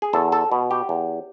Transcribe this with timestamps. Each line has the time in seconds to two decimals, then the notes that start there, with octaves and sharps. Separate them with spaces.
0.02 G#4
0.13 E2 A4
0.32 A4
0.52 B2
0.71 G4
0.89 E2